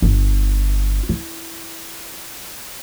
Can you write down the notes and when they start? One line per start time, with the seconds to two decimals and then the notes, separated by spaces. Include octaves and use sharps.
0.02 G1
1.09 E4